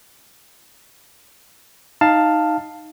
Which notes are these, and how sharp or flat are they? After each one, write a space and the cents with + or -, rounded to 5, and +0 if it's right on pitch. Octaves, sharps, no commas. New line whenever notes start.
D#4 +0 F5 +0 A5 +10